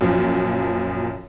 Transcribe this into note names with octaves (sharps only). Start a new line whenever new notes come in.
F#2 A#2 F3